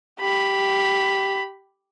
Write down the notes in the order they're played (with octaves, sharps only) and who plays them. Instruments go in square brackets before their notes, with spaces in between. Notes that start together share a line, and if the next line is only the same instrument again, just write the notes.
[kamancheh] G4 B5